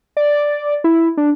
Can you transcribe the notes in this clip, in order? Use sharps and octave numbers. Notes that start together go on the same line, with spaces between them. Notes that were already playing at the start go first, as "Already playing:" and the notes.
D5
E4
D4